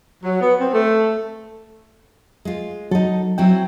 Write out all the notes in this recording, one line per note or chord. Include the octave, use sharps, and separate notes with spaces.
F#3
B3
C4
A3
G#3 F4
F#3 D#4 A4
F#3 C4 E4 G5